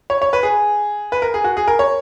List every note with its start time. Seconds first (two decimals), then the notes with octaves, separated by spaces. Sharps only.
0.10 C#5
0.22 C#5
0.33 B4
0.43 G#4
1.12 B4
1.22 A#4
1.34 G#4
1.44 F#4
1.57 G#4
1.68 A#4
1.79 C#5